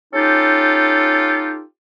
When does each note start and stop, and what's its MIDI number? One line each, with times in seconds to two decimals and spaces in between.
0.13 1.62 61
0.13 1.62 63
0.13 1.62 65
0.13 1.62 67
0.13 1.62 69